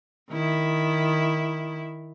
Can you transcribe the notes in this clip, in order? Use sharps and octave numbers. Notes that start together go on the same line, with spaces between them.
D#3 E4